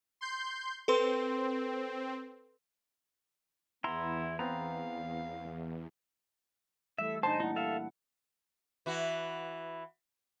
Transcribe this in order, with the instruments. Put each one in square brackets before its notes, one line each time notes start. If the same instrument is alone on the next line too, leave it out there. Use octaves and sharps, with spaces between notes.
[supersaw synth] C6 G6
[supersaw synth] C4 [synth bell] A4 B4 C6
[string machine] E2 [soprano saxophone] B3 [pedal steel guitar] E4 A#5 C6
[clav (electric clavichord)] B3 C4 [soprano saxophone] F5 [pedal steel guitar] A#5
[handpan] E3 G3 A3 [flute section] E4 A4 E6 [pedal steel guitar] E5
[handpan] A#2 D4 [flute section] D#4 D#5 G#5 [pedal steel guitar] C5 [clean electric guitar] A5
[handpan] G3 A#3 E4 [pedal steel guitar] D#4 [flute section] F#5
[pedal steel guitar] A4 E5 F5
[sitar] E3 F#4